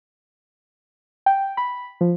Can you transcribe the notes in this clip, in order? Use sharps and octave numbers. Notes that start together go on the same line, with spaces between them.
G5
B5
F3